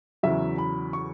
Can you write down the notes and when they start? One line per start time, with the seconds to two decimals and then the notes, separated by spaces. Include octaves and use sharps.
0.23 E2 C#3 F#3 E5
0.58 B5
0.93 C#6